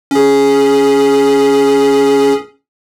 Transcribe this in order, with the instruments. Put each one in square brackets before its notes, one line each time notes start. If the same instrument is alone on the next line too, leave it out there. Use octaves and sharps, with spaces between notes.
[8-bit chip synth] C#4 G#4